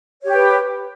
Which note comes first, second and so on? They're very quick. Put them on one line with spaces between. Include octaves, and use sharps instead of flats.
C#5 G4 G5 B4